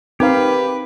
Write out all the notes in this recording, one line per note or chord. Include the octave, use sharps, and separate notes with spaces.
C4 D#4 G4 A#4 B4 F5